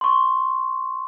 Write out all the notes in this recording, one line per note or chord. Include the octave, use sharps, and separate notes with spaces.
C6 C#6